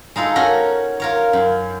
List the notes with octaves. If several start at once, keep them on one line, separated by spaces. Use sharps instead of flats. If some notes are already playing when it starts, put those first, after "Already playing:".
G#3 D#4 F4 A4
C#4 F#4 A#4 C#5
F4 A#4 C#5
F#2